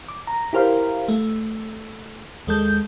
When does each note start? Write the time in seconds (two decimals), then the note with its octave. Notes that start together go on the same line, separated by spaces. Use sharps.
0.08 D6
0.27 A#5
0.53 E4 G4 A#4 C5 F5
1.08 A3
2.47 D#2 G#3 A4 G6